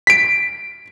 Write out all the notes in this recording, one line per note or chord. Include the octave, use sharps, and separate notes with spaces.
B6 D7